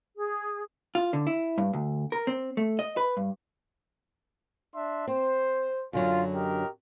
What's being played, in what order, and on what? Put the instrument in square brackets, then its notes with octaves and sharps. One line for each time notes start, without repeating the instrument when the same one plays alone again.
[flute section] G#4
[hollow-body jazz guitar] F4
D3
E4
G2
D2
A#4
C4
A3
D#5
B4
G2
[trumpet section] D4 E5 C6
[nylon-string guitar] C4 [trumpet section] C5
[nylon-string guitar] F#2 D3 F#3 [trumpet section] F4
[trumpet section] G4 A#4 D#5